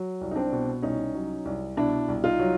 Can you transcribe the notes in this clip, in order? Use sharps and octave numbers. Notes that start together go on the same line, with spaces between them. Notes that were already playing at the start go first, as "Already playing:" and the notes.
Already playing: F#3
C2
D#4
C4 D4
B2
C2 C#4 D#4
F#3
C2
B2 D4 E4
C2
D#4 F4
F#3